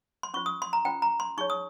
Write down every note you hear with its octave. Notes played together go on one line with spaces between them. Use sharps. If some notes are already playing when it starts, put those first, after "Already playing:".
C6
C#4 F4 C5 C#6
D#6
C6
A#5
C#4 F4 C5 G5
A#5
C6
D#4 G#4 C#5 C#6
D#6